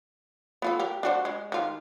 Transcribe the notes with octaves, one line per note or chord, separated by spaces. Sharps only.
B3 F4 A4
G4 A#4
D4 F#4 C5
G#3
D#3 F4